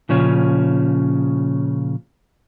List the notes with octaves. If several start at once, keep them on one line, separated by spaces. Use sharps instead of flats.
A#2 C#3 F3 C#4